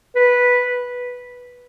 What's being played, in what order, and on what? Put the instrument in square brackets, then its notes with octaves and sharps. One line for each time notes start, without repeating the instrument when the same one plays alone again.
[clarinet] B4